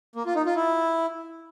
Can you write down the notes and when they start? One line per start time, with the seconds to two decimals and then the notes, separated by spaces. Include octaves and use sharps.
0.16 A#3
0.26 F4
0.36 D#4
0.46 F4
0.56 E4